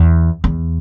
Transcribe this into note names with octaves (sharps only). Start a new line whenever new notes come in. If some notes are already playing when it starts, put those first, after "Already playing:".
Already playing: E2
E2